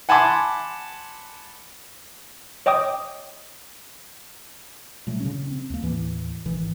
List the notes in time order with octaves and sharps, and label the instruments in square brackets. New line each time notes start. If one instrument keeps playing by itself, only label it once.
[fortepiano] F#5 G#5 A5 B5 C6 D6
[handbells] C#5 D#5 G5 D6 D#6
[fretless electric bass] A#2 F#3 G3 A3
C#3 C#4
C4
D#2 A#3
D#2 A2 E3
A1 G#2 D#3 E3